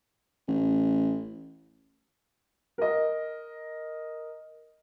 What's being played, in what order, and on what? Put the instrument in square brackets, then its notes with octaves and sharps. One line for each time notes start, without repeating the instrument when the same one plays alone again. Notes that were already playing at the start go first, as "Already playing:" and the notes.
[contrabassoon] A1
[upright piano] A#4 D#5